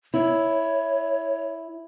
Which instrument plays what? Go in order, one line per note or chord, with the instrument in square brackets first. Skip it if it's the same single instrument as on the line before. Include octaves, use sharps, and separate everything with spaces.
[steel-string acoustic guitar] E4 [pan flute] C#5